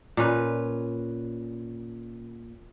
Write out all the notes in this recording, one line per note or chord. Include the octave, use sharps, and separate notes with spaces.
A#2 C#4 B4